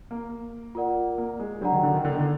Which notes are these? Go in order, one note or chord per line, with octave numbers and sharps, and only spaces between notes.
A#3
F4 A#4 D5 F#5
A#3
G#3
F#3 D4 F#4 D5 F#5 A#5
D#3
D3
D#3
D3
D#3
D3